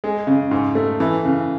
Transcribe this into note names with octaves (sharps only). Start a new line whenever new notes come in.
G#3
C#3
G#2
A3
E3
C#3